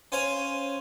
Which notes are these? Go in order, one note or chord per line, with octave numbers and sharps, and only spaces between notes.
C#4 C5 F5 G#5